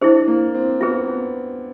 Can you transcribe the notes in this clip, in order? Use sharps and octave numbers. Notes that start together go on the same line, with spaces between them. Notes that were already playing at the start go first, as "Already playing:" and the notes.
D4 E4 G#4 C5
A#3
C4
B3 F4 G#4 B4
B3